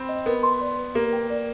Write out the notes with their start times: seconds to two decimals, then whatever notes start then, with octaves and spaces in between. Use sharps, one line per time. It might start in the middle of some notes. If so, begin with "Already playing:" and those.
Already playing: C4 G5 B5
0.09 D#5
0.26 B3 A#4
0.43 C6
0.61 D5
0.78 B4
0.95 A#3 G4
1.13 G5
1.30 D5